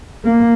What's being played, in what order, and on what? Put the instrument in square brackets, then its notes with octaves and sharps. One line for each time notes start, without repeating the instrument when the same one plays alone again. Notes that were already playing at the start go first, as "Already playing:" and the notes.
[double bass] A#3